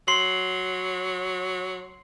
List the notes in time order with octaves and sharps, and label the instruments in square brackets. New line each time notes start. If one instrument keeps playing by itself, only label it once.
[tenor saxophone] F#3 [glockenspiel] C6 C7 F#7